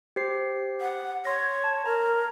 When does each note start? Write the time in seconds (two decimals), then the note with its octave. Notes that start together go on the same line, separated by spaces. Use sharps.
0.16 G4 C5 C7
0.81 F#5
1.25 C#5 C6 A#6
1.64 A5
1.86 A#4 A#5